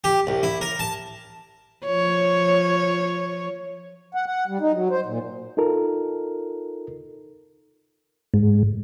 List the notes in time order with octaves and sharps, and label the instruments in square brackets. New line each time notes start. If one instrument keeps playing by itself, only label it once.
[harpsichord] G4
C2
E4
A#4
A5
[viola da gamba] F3 C#5
[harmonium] F#5
F#5
G3
D#4
F#3
C5
A#2
[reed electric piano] D#4 F4 A4 A#4
[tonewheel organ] G#2